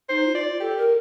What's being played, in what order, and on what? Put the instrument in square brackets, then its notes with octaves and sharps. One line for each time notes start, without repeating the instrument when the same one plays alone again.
[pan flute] D#4 [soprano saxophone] C5
[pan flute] F4
[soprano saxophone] D5
[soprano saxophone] G4 [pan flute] A4
[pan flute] A#4